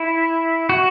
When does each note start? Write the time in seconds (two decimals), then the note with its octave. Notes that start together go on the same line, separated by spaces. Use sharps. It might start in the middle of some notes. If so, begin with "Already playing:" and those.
Already playing: E4
0.69 F#4